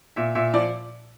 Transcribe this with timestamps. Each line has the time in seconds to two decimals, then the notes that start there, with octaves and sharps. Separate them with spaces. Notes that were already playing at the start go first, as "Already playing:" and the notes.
0.16 A#2 E5
0.35 A#2 E5
0.54 F3 D5